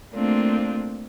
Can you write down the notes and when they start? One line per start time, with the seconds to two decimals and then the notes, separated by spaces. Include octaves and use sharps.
0.14 A3 A#3 C4 D4 F4